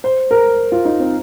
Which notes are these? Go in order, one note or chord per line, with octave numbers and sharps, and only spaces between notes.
C5
A#4
F4
D#4
C4